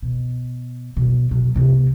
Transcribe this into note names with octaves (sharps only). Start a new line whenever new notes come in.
B2
B2 G3
B2 F#3
C3 A#3